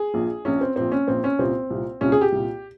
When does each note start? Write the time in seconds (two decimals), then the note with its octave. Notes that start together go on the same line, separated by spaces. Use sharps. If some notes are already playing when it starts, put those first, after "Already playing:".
Already playing: G#4
0.14 A#1 A#2
0.45 A#1 A#2 C#4
0.61 C4
0.76 A#1 A#2 C4
0.92 C#4
1.08 A#1 A#2 C4
1.24 C#4
1.39 C2 A#2 C4
1.70 C2 A#2
2.01 C2 A#2 C#4
2.12 G#4
2.21 G4
2.32 C2 A#2